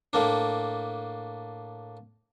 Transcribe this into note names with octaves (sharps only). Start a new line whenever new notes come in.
A2 A#3 D4